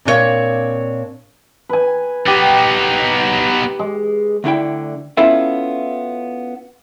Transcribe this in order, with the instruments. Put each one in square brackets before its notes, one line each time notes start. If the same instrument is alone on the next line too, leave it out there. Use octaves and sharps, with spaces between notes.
[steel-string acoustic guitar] A#2 C4 D4 F4 C#5 F5
[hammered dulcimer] B4 G#5
[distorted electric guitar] B3 D#4 [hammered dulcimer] G4
[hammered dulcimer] G#3
[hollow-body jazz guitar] D2 D3 E4 G5
B3 C#4 E4 F4 A4 E5